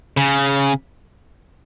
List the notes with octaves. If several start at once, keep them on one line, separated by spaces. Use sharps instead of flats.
C#3